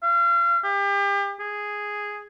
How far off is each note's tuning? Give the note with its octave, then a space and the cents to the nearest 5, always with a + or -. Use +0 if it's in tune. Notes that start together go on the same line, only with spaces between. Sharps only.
F5 -35
G4 +35
G#4 +0